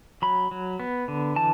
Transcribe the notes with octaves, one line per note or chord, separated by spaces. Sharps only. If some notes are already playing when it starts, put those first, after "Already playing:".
F#3 B5
F#3
B3
D3
E3 A5